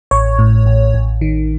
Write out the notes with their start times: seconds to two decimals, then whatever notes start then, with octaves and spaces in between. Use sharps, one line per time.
0.11 A1 C#5
0.39 A2
0.66 A1
0.94 A1
1.21 D#3